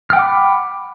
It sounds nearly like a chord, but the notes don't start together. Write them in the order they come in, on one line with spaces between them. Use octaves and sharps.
F6 G5 F#5 D6 B5